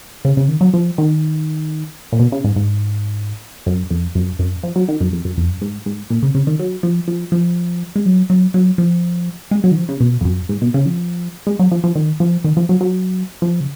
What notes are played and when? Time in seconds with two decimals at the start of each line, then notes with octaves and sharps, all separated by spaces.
0.25 C#3
0.37 C#3
0.48 D#3
0.61 F#3
0.74 F3
0.98 D#3
2.12 A#2
2.19 B2
2.32 C#3
2.44 G#2
2.56 G#2
3.66 F#2
3.90 F2
4.15 F#2
4.39 F#2
4.63 F3
4.76 F#3
4.88 D#3
5.01 F#2
5.13 F2
5.25 F#2
5.37 F2
5.49 F#2
5.61 G#2
5.86 G#2
6.10 A#2
6.23 C#3
6.35 C#3
6.47 D#3
6.59 F#3
6.83 F3
7.08 F3
7.32 F3
7.96 G#3
8.06 F#3
8.30 F#3
8.54 F#3
8.78 F3
9.51 G#3
9.64 F#3
9.72 D#3
9.76 F3
9.89 C#3
10.00 B2
10.21 F2
10.25 F#2
10.49 G#2
10.62 B2
10.74 C#3
10.86 F3
11.47 G#3
11.59 F#3
11.71 F3
11.84 F3
11.95 D#3
12.20 F3
12.44 D#3
12.57 F3
12.69 F#3
12.81 F#3
13.42 F3
13.60 C#3